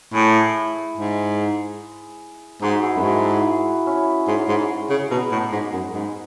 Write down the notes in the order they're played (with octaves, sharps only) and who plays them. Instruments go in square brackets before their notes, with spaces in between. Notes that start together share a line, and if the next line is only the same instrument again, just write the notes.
[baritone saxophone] A2 [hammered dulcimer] E4 G#4
[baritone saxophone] G#2
[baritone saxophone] G#2 [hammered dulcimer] D#4 F#4
[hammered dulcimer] E4 G#4
[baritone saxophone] F#2
[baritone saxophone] G#2 [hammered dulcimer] F#4 A4
[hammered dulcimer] E4 G#4
C#4 E4
[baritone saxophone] G#2
G#2
C#3
[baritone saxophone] B2 [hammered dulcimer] B3 D#4
[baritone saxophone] A2
G#2
F#2
G#2